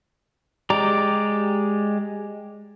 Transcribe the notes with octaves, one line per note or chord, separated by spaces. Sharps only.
G#3 G4 D5 A#5 D6